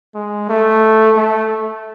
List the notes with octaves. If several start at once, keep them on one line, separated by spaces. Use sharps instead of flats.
G#3
A3
A3